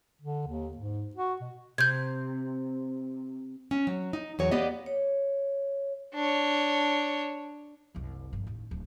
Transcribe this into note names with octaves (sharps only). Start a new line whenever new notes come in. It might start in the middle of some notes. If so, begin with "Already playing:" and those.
D3
D#2
G#2
F#4
B2
C3 G6 G#6
C#4
F#3
D#4
E2 F#3 C#5
A#3 B3 G4 D5 D#5
C#5
D4 C#5
F#1 C2
G1 F2
A1 D#2
D1